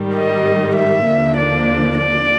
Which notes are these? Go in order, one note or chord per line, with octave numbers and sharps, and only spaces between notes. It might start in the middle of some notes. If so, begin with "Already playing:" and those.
Already playing: G#2 D#3 G3
D#5
E5
D#2 D3 F3 A#3 D4
D5
D5